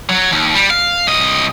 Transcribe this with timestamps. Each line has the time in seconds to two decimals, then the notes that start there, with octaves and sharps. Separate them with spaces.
0.09 F#3
0.32 D#2
0.55 G3
0.70 F5
1.07 C2 D#5